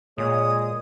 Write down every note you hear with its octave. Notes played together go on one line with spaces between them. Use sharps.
A#2 G#3 C#5 D#6